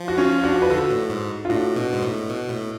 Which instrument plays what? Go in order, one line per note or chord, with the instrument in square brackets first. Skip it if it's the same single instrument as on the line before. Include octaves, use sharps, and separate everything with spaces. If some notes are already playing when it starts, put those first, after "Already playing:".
Already playing: [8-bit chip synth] F3
[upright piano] F#4
C#4 F4
D4 F#4
B4
[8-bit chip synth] D3 [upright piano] F#4 A4
[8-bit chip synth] A2
G#2
[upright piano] F4
[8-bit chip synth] A2 [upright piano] D4 F#4
[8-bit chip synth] B2
G#2
A2
B2
A2